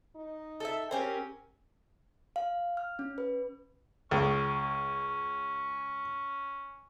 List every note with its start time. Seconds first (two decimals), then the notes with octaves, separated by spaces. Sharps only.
0.16 D#4
0.60 A4 D#5 E5
0.91 C4 C#4 G4 A#4
2.36 F5
2.77 F6
2.99 C#4
3.18 B4
4.11 C#2 C#4